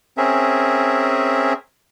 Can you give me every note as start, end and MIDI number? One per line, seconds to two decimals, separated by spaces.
0.17 1.53 60
0.17 1.53 61
0.17 1.53 68
0.17 1.53 70
0.17 1.53 76